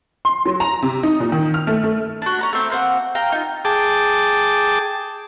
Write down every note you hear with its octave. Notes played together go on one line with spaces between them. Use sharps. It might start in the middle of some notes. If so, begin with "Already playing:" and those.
C6
F#3
A#5
C3
D#4
A#2
D#3
F6
A3
A3
D4 F#4
C#4 A#5 F#6
A3 C4
A#3 C4 F#5
F5 G5 A#5
D#4 F4
G#4 G5 A5 D6